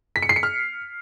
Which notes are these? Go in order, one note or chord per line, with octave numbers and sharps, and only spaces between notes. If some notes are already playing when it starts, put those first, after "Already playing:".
B6
C#7
C7
C#7
F6